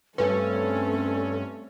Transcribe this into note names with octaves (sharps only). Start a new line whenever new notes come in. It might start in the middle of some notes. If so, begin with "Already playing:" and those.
G2 A3 C4 C#4 A4 B4